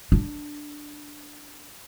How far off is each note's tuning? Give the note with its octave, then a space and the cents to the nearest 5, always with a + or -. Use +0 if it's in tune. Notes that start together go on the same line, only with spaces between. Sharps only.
D4 +5